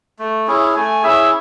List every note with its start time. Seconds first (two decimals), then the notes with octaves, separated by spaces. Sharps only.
0.19 A3
0.47 C#4 E4 G#4
0.75 A3 G#5
1.03 C#4 E4 G#4 E5